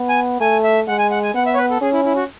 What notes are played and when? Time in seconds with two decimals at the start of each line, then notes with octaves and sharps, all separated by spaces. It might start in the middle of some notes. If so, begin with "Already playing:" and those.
Already playing: B3
0.09 G#5
0.40 A3 G#5
0.64 E5
0.88 G#3 F#5
0.99 G#5
1.11 F#5
1.23 G#5
1.34 B3 F#5
1.46 E5
1.54 C#5
1.58 B4
1.70 A4
1.81 C#4 G#4
1.93 E4
2.05 E4
2.16 F#4